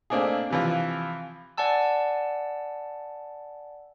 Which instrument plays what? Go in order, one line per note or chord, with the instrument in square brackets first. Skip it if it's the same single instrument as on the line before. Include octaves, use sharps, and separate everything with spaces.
[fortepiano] A3 A#3 C4 D4 D#4 G#4
C3 E3 F3
[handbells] D5 F#5 G#5 A5 E6